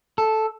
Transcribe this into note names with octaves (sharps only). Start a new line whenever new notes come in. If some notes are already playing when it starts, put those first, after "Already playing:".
A4